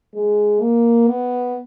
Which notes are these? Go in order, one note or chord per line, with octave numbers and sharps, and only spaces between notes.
G#3
A#3
B3